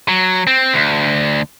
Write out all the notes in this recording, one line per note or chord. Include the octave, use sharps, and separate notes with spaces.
F#3
C4
D2